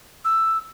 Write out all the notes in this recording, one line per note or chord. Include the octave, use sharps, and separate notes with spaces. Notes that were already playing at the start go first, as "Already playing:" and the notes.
E6